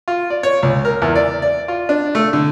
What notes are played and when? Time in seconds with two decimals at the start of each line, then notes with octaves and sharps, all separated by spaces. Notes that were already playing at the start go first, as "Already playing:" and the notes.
0.08 F4
0.30 D5
0.43 C#5
0.63 C#2
0.85 A#4
1.02 E2
1.15 D5
1.42 D5
1.68 F4
1.89 D4
2.15 A3
2.33 D3